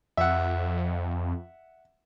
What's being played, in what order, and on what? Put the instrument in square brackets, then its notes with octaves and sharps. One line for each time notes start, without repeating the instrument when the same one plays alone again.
[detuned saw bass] F2 [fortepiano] E5 F#5